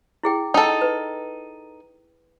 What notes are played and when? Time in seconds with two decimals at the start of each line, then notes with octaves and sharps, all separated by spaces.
0.23 E4 G#4 G5
0.54 D#4 A4 G5
0.82 B4